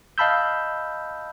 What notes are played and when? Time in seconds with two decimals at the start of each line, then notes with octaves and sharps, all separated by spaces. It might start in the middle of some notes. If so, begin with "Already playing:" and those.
0.18 D#5 F5 A5 B5 E6 G6